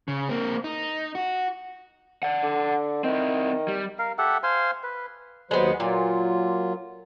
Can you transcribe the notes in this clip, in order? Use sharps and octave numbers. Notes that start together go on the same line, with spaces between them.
C#3
A#3 C4
D#4
F#4
D5 F#5
D3
D#3 C4 E4
G3
A#4 F5
G4 A4 E5 F#5
C5 F5 G#5 C6
B4
D#2 F#3 G#3 B3 C5
A#2 F#3 F4